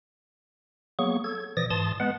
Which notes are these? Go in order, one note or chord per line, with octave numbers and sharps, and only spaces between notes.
F#3 A#3 B3 G#4 C#6
A4 G#6
B2 E3 F3 D5 D#6 A#6
G#2 E3 A5 C6 D#6 A6
G#3 B3 B4 F#5